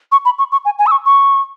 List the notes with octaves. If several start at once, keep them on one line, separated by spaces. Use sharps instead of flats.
C#6
B5
C#6
C#6
G#5
G#5
E6
C#6
C#6